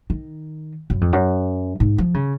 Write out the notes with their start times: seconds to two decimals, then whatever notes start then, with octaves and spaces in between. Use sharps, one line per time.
0.10 D#3
0.90 F#2
1.01 F2
1.13 F#2
1.80 G#2
1.98 F3
2.14 C#3